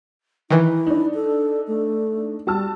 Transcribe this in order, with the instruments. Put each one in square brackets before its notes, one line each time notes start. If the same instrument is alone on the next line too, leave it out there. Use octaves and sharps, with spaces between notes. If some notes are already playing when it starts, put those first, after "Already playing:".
[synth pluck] D#3 E3 [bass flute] E4
[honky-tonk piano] D4 D#4
[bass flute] A4
A3
[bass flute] G3 [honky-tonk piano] F#4 A5 E6